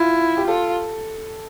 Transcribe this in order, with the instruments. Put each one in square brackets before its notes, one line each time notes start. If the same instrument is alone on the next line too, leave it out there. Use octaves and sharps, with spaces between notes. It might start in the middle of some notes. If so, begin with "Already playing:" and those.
Already playing: [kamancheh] E4 [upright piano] F4
[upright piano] G4
[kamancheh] F4 [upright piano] A4